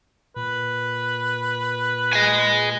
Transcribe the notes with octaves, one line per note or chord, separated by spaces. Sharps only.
A#2 B4
D#5 G#5